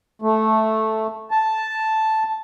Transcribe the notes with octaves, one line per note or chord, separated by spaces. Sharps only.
A3
A5